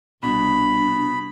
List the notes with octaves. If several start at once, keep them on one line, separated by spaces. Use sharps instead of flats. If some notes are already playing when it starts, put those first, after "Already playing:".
C2 B2 D4 B5